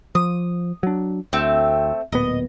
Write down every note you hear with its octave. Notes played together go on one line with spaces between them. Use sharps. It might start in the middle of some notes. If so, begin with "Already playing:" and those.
F3 D#6
F#3 D4
D2 A3 C4
D1 A#2 B3 D#5